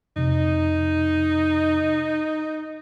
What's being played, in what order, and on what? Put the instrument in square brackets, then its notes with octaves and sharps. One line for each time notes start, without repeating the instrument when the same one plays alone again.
[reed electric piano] F2 C3 [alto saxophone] D#4